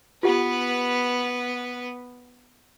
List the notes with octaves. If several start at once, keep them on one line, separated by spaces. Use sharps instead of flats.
B3 F4 G4 B4 F#5